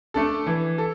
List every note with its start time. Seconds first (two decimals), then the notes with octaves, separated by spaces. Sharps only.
0.14 A3 D4 A4
0.46 E3
0.78 A4